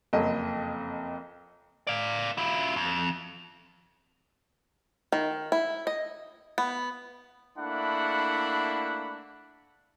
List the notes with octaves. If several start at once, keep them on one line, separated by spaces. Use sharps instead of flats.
F#1 F2 D#5
D5 F5
E4 F4
F2
D#3
E4
D#5
B3
A3 A#3 D4 E4 F#5 B5